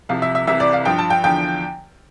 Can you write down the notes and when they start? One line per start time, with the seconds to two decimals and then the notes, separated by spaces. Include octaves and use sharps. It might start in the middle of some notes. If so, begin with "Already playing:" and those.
0.09 C2 C3 F3 F5
0.22 E5
0.35 E5
0.47 C2 C3 E3 E5
0.60 D5
0.73 F5
0.85 G2 F3 G5
0.98 A5
1.10 G5
1.24 E2 D3 F3 G5